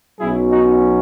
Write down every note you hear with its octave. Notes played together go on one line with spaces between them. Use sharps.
B1 B2 F#3 C#4 E4 G#4
D#4 F#4